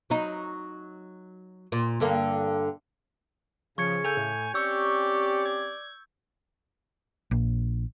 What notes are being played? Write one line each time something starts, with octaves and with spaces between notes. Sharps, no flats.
F#3 D#4
A#2
G2 D3 A#3
C#3 F3 C#6 G#6 C#7
A4 G#5 G6 F7
A2
C4 C#4 G4 D5 C#6 E6 G6
G#6
A#1